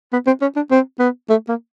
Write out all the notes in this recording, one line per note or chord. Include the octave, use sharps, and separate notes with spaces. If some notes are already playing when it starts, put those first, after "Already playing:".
B3
C4
C#4
D4
C4
B3
A3
A#3